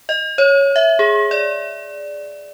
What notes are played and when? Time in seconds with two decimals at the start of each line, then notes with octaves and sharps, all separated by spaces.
0.09 D#5
0.38 C#5
0.76 E5
0.99 G#4
1.31 D5